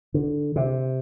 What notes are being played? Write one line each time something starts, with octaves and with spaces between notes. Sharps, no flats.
D3
C3